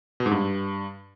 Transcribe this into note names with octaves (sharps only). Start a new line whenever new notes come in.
B2
G#2
G2